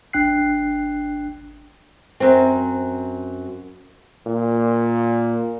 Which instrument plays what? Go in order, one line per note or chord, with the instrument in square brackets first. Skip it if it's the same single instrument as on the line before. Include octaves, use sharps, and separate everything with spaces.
[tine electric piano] G#1 D4 G5 F#6 C7
[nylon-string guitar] F#2 C4
[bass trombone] A#2